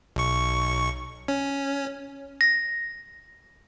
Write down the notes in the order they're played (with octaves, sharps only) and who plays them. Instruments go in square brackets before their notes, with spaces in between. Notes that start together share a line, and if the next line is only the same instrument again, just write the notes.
[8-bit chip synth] B1 C#6
C#4
[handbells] A#6